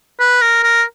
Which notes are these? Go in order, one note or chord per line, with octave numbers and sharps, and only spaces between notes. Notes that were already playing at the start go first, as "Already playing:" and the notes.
B4
A#4
A#4